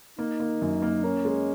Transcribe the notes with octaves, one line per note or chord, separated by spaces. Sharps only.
A#3 D#4
A#3
F#2
A#3
C#4 A#4
G#3